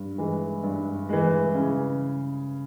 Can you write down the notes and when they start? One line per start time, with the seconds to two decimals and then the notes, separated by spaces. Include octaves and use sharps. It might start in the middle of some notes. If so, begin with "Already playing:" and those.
Already playing: G2
0.18 E3 G#3
0.63 G2
1.09 E3 G#3
1.54 C#3